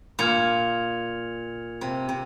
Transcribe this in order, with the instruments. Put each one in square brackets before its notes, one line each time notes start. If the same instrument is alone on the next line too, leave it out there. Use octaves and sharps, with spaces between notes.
[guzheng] A#2 [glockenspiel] F6 G#6 C#7 F7
[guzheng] C3
C3